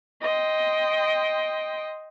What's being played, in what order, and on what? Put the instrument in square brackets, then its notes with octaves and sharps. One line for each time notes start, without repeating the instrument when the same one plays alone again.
[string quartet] D#5 G5 C6